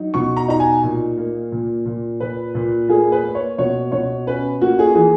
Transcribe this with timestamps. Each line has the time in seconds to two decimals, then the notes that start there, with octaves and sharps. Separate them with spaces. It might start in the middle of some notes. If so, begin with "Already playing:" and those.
Already playing: F#3 D#4
0.14 B2 C#6
0.37 A#5
0.48 D#4 A#5
0.60 G#5
0.83 A#2
1.18 A#3
1.52 A#2
1.86 A#2
2.20 A#2 B4
2.55 A#2
2.89 A#3 G#4
3.12 B4
3.24 A#3
3.35 C#5
3.58 B2 C#5
3.92 B2 C#5
4.27 C#4 B4
4.61 A#3 F#4
4.79 G#4
4.95 E3 G#4